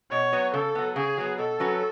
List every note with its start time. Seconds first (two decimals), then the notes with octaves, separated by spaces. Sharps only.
0.11 B2 C#5
0.33 F#3 B3
0.54 C#3 A4
0.75 F#3 B3
0.96 C#3 G#4
1.18 F#3 B3
1.38 B2 A4
1.60 F#3 C#4 F#4 B4